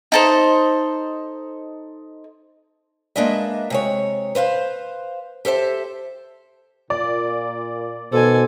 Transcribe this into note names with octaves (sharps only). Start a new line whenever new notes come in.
D#4 A4 C5
G#3 A#3 D4 B4 D#5 E5
C3 G#3 C#5
B4 C5 E5 F5
G4 A4 C5 E5
A#2 D5
B2 D#3 A4 C5 G#5